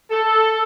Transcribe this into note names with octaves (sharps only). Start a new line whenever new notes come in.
A4